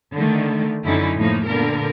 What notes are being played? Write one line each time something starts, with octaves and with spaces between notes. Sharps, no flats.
D3 D#3 A3
F#2 D3 C#4 D#4 E4
A2 F3 A3 A#3 D#4
A#2 D3 B3 A#4